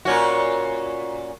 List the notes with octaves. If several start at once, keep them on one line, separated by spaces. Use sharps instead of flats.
A#2 C#4 F#4